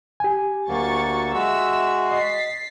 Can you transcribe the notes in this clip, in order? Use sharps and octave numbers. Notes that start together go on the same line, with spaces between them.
G4 G#5
D2 F#3 A#3 C#6 A6
G#3 F#4 E5 E6
D#5 A6 B6 C7